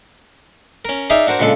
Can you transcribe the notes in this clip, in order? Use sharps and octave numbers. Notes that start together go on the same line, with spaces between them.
C#4 A#4
D#4 G#4 D5 E5 F5
D4 F#4 A#4 C5
A#2 C#3 G#3 D4 A4